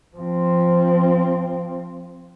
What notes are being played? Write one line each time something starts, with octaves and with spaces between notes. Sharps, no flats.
F3 C4